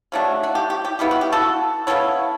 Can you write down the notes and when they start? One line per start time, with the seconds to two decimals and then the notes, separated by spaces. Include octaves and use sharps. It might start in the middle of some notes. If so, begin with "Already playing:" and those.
0.12 C#3 F#3 A3 D4
0.43 F#4
0.55 G4
0.70 G4
0.85 G4
0.99 C#3 G3 B3 E4 G4
1.11 F#4
1.21 G4
1.32 F#4 A4
1.87 C#3 G3 B3 E4 A4 C#5